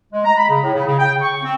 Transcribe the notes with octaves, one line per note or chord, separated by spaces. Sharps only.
G#3
A#5
B5
C#3
A2
C#3
C#3
G5
C#6
C4